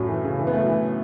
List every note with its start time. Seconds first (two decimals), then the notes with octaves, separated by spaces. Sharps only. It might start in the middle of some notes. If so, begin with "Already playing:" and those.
Already playing: F#2 A2 F#3 A3
0.09 E3
0.24 C#3
0.39 E3
0.47 B3
0.53 A3
0.61 F#3
0.68 E3